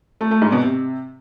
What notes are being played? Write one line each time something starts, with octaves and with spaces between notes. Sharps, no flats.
A3
A3
G#2
B2
C3